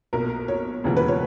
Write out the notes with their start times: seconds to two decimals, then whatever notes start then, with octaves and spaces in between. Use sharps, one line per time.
0.13 B1 A#2 A#4
0.48 C#5
0.84 E1 D#2 C#3 E3
0.97 B4
1.08 C#5